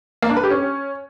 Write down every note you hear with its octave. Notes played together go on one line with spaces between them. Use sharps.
A#3
D4
B4
G4
C#4